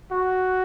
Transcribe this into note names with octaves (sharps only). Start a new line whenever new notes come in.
F#4